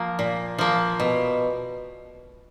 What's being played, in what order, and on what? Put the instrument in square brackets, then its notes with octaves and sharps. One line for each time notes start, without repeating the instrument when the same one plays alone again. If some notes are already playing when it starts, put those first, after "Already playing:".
Already playing: [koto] F3 A#3
A#2
F3 A#3
B2